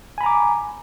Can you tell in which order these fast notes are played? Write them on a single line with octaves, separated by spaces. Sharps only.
G#5 B5 A#5 D6